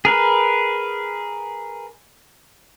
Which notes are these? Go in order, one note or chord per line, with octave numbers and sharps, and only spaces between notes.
G#4 A#4 B4